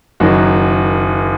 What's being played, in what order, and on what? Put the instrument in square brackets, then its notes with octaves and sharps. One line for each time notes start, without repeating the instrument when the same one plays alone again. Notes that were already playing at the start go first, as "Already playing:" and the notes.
[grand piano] F#1 F#2 D#3 F#3 F#4